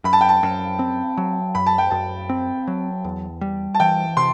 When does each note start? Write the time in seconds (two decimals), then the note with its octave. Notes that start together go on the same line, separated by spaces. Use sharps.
0.04 F#2 B5
0.13 A5
0.21 G5
0.29 A5
0.43 F#2
0.79 C4
1.17 F#3
1.55 F#2 B5
1.66 A5
1.78 G5
1.90 F#2 A5
2.29 C4
2.67 F#3
3.04 E2
3.41 G3
3.74 A5
3.80 E3 G5
4.17 C3 C6